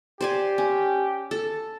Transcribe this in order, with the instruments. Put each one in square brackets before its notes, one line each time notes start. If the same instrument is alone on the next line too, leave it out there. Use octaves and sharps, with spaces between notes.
[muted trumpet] G4 [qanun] C5 D5 G#5
[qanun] C#4
A4